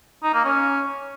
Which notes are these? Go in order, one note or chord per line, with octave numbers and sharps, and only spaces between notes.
D#4
A#3
C#4